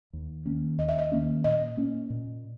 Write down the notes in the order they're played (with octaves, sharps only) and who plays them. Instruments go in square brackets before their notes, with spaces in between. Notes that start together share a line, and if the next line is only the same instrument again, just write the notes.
[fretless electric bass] D#2
D#3 A#3 C#4
[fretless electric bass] D#2 [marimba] D#5
[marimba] E5
D#5
[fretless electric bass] D#3 A#3 C#4
[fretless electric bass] A#2 [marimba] D#5
[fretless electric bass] A#3 C#4
A#2